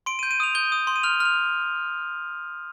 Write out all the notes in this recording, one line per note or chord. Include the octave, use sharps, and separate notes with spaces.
C6 D7
D#7
G6
D#7
D#6 F7
G6 G7
D#6
C6
D#7
F6 F7
F6
F7